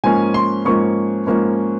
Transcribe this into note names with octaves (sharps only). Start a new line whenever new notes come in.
G#2 F3 A#3 C#4 G#5
C6
G#2 F3 A#3 C#4 C#6
G#2 F3 A#3 C#4